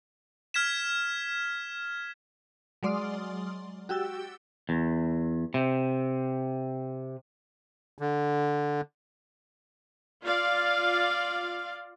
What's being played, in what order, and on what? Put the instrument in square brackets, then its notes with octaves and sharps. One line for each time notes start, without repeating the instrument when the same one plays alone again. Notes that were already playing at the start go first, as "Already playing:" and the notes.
[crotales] F6 G#6 B6 E7
[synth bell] F#3 G#3 D5 C6 D#6 F6
F#4 G4 G5 E6 A6 G7
[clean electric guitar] E2
C3
[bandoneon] D3
[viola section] F4 D5 F5